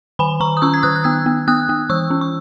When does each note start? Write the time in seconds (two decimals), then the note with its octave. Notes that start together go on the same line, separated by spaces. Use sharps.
0.19 D#3 G#5 B5
0.40 D#3 A#5 C#6
0.57 D#6
0.62 C#4 C#6 E6
0.74 G#6
0.83 D#3 D#6 F#6
0.95 F#6
1.04 B3 E6 G#6
1.26 B3
1.48 B3 D#6 F#6
1.69 B3
1.90 E3 C#6 E6
2.10 C#4
2.21 C#6